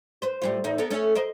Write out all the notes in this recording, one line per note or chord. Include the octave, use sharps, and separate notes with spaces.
B4 C5
A2 G3 F4
E2 A2 D#4
B3 A4 A#4
A3 C#4 A4
A#4 C5 D#5